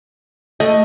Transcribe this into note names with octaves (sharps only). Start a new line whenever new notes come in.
A3 D#5